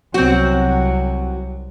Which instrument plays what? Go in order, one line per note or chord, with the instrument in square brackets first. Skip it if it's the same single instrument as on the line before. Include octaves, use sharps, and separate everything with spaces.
[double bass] C2 F#3 [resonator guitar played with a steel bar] C4 F#4